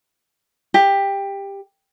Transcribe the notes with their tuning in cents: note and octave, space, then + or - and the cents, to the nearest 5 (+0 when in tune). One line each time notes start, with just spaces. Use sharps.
G4 +15